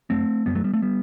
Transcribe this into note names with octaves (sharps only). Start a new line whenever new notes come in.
F#2 A3 C4
F#2 G3 B3
F#3 A3
G3 B3
A3 C4
G3 B3